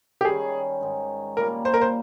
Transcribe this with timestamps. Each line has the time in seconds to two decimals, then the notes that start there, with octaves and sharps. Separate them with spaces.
0.21 G4
0.25 D#3 G3 C#4 G#4
0.81 G#2 D#3 G#3
1.37 A#2 G3 A#3 A#4
1.65 C5
1.74 A#4
1.81 C5